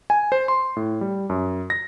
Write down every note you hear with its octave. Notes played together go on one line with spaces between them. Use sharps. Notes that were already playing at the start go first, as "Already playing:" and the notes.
G#5
C5
C6
A2
G3
F#2
A#6